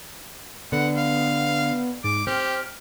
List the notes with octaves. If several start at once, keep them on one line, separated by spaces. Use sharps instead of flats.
D3 B3 F#5
F5
G#2 D6
C4 G4 F6